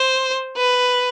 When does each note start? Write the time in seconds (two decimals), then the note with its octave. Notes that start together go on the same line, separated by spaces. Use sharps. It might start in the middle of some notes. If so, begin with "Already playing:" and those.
Already playing: C5
0.57 B4